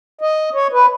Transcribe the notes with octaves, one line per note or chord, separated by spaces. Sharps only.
D#5
C#5
B4